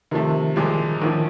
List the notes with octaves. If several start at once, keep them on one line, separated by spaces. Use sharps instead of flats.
C3 D#3 F3 A3
C2 A#2 F3 G#3
A#1 A2 D#3 F3